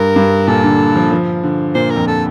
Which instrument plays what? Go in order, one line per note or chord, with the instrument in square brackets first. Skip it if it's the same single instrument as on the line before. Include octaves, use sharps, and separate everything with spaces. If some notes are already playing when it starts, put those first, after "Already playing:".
Already playing: [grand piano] G2 [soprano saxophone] A#4
[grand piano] G2
[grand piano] A#2 [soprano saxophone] A4
[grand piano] D3
F3
F3
D3
[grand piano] A#2 [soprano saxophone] C5
[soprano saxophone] A#4
[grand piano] F2
[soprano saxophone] A4